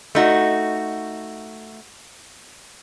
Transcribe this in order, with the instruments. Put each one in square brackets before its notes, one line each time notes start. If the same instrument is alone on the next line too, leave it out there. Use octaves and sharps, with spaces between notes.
[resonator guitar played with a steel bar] A3 D#4 F#4